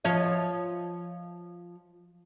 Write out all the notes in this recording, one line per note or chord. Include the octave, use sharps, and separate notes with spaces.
F3 C#5 D#5